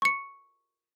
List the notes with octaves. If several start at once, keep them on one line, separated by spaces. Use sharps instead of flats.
C#6 C#7